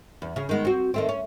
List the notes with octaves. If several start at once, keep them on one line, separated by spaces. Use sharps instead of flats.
E2
C#3 G#4
D#3 G#3 B3
C4 F#4
D#3 A3 C4
C#4